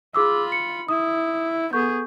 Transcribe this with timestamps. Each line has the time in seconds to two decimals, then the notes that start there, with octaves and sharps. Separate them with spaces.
0.15 F4 G#4 B5 D6 E6
0.52 C#7
0.88 E4 D#6
1.73 B3 G#4 A4 C#6 G6